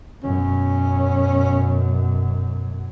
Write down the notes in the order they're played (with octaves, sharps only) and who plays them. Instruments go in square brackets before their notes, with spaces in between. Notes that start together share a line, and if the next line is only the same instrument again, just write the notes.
[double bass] F#2 B2 [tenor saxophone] C#4